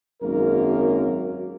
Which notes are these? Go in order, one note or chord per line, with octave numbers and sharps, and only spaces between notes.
G#1 F#2 A#3 A#4